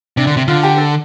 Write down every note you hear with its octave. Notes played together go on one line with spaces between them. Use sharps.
C3 D4
D3
C3
D3 F4
G4
A4